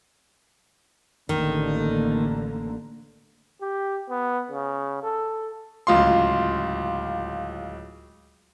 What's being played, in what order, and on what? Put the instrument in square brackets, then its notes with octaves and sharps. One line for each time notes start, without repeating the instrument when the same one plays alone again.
[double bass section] A1 D3 A#3 [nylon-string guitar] D#3
[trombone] G4
B3
C#3
A4
[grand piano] D1 C#2 F4 C6